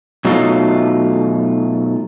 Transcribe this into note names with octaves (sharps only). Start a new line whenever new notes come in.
B2 F#3 A3 D#4 F4